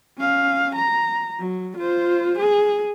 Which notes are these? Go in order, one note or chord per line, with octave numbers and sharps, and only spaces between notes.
C#4 F5
A#5
F#3
F4 C5
G#4